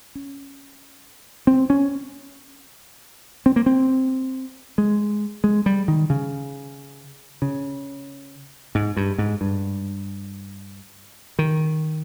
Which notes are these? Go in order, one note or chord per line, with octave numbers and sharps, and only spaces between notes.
C#4
C4
C#4
C4
A#3
C4
G#3
G#3
G3
D#3
C#3
C#3
G#2
G2
G#2
G2
D#3